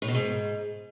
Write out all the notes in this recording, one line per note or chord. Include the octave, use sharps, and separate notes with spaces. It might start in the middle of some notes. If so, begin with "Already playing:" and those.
A2
B2
G#2